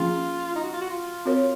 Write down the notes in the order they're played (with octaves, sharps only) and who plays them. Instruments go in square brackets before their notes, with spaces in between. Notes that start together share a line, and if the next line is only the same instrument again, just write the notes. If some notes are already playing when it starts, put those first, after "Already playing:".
Already playing: [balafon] F3 A#3 C#4 G#4 [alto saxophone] F4
[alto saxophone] D#4
F#4
F4
F#4
F4
[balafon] C4 F#4 A#4 C#5